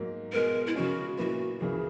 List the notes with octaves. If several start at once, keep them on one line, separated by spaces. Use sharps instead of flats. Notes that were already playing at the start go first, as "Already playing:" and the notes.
Already playing: G#2 F#3 A#3
B2 G#3 B3 A#4
E4
C#3 G#3 C#4 F#4
A#2 F#3 A#3 E4 F#4 B4
C#2 C#3 E3 A#3 E4 G#4